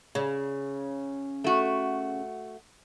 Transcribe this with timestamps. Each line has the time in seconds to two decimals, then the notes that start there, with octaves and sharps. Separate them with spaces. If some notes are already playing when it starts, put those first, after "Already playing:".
0.15 C#3
1.44 A3 F#4